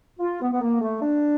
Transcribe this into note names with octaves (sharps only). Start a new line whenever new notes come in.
F4
B3
B3
A#3
A3
D4